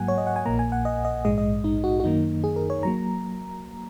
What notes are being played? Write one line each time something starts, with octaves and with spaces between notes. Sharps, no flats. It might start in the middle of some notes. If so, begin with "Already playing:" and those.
Already playing: G#2 F#3 A#3 F#5 G#5
C#5
D#5
F#5
G#5
A#1 A#2 A#3 A#5
G#5
F#5
D#5
D#5
A#1 G#2 G#3 D#5
D#5
D#4
F#4
F#4
F#2 D#3 A#3 D#4
G#4
A#4
C#5
F#3 A#3 A#5